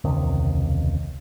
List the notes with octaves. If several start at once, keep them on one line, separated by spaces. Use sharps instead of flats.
E1 C#2 C3 D#3